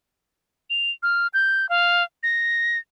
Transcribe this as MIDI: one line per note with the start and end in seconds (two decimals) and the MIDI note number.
0.70 0.91 101
1.03 1.27 89
1.34 1.69 91
1.69 2.03 77
2.23 2.78 94